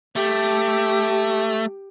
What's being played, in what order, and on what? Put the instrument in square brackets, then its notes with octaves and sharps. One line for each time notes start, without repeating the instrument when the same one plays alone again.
[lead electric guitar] A3 [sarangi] G4